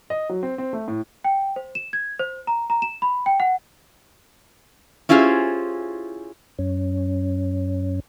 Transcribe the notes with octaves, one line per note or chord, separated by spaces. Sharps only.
D#5
F#3
C4
C4
A3
A2
G5
C5
E7
G#6
C5
A#5
A#5
E7
B5
G5
F#5
C#4 E4 F4 G4 G#4 C5
F#2 C#4